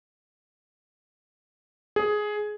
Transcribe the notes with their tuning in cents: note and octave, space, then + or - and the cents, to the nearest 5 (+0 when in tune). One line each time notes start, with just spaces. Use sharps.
G#4 +10